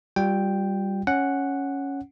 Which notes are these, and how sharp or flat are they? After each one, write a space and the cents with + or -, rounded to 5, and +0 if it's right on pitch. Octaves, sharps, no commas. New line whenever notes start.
G3 +0 F4 +25 G5 +0
C#4 +0 F#5 +0